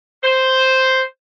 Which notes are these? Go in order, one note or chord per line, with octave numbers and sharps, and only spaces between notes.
C5